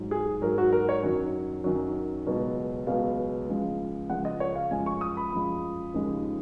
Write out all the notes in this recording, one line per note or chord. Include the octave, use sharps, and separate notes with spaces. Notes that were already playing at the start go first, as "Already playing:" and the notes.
Already playing: G#2 F#3
G#4
G#2 F#3 A#4
F#4
A#4
C#5
F#2 D#3 F#3
F#2 D#3 F#3
C#2 B2 F#3
C#2 B2 F#3 F5
C#2 C#3 F3 G#3
C#2 C#3 F3 G#3 F#5
D#5
C#5
F5
F#2 F3 G#3 G#5
C#6
D#6
B5
F#2 F3 G#3
D#2 C#3 F3 G#3